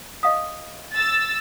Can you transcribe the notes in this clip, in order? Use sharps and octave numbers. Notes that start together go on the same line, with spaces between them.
D#5 F5 D#6
E6 A6